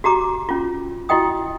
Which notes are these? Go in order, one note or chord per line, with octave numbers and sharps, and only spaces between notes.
F#4 G4 A#5 D6
C#4 F4
E4 F#4 D#5 G5 D#6